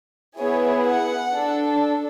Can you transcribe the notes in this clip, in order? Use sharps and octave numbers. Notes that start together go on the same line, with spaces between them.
B3 E4 G#4 C#5
F#5
D4 A4